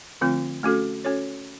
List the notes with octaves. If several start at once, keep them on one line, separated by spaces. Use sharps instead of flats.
D3 F3 A3 C4 F4
A3 C#4 F#4 A4
C#4 F#4 A4 C#5